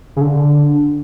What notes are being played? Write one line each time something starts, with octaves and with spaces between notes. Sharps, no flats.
C#3
D3